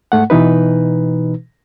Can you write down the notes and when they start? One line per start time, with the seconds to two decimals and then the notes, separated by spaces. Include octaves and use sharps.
0.12 G#2 A3 F#5
0.30 B2 E3 D#4 B4